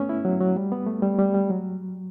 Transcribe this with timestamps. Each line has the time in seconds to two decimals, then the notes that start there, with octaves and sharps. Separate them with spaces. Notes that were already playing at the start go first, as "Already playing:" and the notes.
Already playing: A3 B3 C#4
0.09 E4
0.25 F#3
0.40 F#3
0.56 G3
0.72 B3
0.86 A3
1.02 G3
1.19 G3
1.34 G3
1.50 F#3